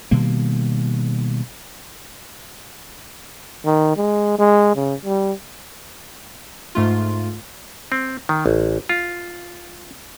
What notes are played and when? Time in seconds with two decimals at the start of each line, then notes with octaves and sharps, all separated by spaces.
0.11 B2 D#3 G3 A#3
3.66 D#3
3.97 G#3
4.39 G#3
4.75 C#3
5.05 G3
6.75 G#2 A3 F4
7.92 C4
8.29 D#3
8.46 A1
8.89 F4